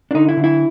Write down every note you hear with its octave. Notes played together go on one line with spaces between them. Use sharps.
D4
D3 D#4
E4
D3
E4